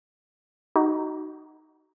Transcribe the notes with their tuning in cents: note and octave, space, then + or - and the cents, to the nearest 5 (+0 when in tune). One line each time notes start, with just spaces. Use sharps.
D#4 +0 F#4 +25